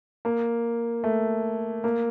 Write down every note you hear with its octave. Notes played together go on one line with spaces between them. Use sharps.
A#3
A3
A#3